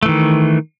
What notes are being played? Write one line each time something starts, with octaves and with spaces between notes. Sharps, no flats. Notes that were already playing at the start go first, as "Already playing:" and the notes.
D#3 E3 A3